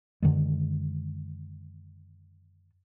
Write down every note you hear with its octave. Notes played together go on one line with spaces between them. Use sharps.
F#2 D3 D#3 G#3